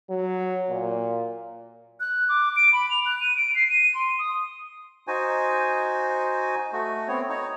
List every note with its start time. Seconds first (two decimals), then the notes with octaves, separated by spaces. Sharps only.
0.10 F#3
0.70 A#2
2.00 F#6
2.29 D6
2.56 D7
2.73 B5
2.91 F7
3.06 F#6
3.20 D#7
3.37 D7
3.55 C7
3.69 D#7
3.95 C6
4.19 D#6
5.08 D#4 F#4 C5 G#5
6.73 A3 F#4
7.08 B3 C4 C#5
7.29 D#4 C#5